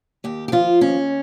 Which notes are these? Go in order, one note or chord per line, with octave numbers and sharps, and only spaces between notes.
D#2 G4
G4
F3 F4
D#2 C#4